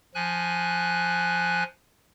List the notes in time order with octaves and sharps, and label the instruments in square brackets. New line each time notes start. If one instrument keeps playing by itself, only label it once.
[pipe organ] F3 G#5 F#6